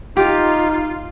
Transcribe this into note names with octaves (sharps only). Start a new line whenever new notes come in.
D#4 F4 G4